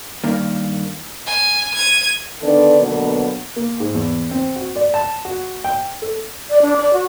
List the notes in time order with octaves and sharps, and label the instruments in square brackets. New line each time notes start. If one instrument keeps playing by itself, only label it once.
[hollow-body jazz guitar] G2 D#3 A#3
[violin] G#5
G#6 D#7
[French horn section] D3 D#3 B3 D4 A4 D5
B2 D3 F#3 A#3 B3
[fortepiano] A#3
G#2
E2
C4
F#4
D5
A5
F#4
G5
A4
[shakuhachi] D5
D4
D5
F#4